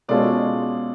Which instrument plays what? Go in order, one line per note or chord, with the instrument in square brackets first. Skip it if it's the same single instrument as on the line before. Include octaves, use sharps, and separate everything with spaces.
[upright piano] B2 G#3 C#4 F4 A4 [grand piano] D5